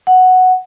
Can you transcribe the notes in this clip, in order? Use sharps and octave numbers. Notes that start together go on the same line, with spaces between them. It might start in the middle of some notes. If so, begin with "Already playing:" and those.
F#5